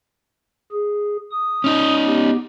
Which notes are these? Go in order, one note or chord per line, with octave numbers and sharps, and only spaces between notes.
G#4
D#6
C#4 D#4
B3 G4